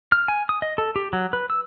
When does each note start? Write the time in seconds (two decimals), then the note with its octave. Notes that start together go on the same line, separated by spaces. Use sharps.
0.12 F6
0.28 G#5
0.49 D#6
0.62 D#5
0.78 A4
0.96 G4
1.13 F#3
1.33 B4
1.50 E6